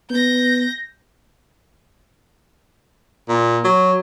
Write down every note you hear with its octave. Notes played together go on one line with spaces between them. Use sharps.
B3 G6 A#6
A#2
F#3